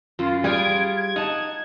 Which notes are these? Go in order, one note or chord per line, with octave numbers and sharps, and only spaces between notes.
F#2 F4
G3 F4 G#4 B4 G#6 D7
G#6
D#4 F#5 A5